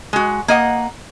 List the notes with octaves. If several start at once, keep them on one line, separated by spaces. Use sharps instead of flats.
G#3 F#4
A#3 D#5 F#5